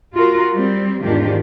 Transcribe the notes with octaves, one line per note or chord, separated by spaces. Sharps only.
F4 F#4 A#4
G3 C4
E2 G#2 D#3 D4 F4 G4